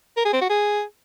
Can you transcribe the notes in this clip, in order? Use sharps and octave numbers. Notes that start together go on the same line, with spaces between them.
A#4
G#4
C4
F#4
G#4